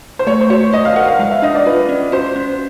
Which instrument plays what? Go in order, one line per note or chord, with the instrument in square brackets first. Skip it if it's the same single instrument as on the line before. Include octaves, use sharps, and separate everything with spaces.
[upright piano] C5
[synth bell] A3 [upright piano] C#5
[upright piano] C5
[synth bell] F#4 [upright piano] C#5
[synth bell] D5 [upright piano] D#5
[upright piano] F5
[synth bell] A#4 [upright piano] F#5
[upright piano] F5
[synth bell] G#3 [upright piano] F5
[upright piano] E5
[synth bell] D4 [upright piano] D#5
[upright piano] D5
[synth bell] F4 [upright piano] B4
[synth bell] C#4
[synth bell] F#4 [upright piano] C5
[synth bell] C#4